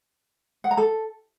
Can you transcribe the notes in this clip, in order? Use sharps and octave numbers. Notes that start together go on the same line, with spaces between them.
F#5
A#5
A4